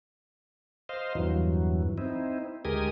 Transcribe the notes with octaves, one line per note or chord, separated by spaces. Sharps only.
C5 D#5 F5
E2 G2 E3 F#3
C4 D#4 E4
D2 G#3 G4 A#4 G#5 D#6